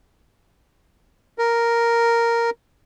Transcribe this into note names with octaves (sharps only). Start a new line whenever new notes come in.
A#4